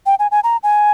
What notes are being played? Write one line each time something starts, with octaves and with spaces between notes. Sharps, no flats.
G5
G#5
G#5
A#5
G#5